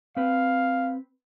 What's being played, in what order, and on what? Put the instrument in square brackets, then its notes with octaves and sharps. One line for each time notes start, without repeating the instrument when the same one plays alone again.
[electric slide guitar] C4 B4 [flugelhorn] F5